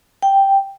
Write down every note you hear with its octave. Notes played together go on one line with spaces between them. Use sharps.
G5